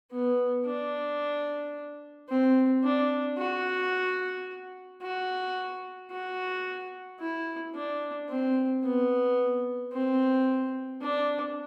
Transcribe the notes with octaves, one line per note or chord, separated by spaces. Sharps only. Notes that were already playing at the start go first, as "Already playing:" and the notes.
B3
D4
C4
D4
F#4
F#4
F#4
E4
D4
C4
B3
C4
D4